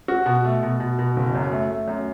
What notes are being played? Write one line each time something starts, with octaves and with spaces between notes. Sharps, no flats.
F#4
B2
A3
B2
B2
B2
F#1
F#2
A3
A3
F#2